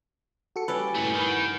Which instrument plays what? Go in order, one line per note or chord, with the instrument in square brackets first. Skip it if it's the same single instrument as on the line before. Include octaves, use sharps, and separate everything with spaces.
[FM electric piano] F#4 A4 C#7
[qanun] G3 C#4 D5 [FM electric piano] B4 [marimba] E6
[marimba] G2 A#2 E4 [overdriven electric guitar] C#3 A3
[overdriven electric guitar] D#3 [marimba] B5 C#6
[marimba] F#5